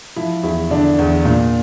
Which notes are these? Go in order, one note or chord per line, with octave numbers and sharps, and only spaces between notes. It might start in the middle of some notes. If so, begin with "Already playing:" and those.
F3 E4
E2 E4
D3 D4
E2
A#2